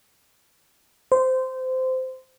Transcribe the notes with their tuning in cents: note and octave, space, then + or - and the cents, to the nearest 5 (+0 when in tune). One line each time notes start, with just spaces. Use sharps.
C5 -20